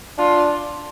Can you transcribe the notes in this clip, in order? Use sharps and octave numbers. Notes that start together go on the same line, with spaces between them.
D4 F4